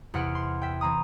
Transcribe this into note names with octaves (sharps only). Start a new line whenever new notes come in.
E2 C3 F#5 F6 D7
C6
E5 G5
E3 C4 A#5 D#6